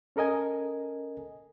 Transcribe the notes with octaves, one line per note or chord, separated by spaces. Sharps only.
C#4 A4 A#4 D#5 G#5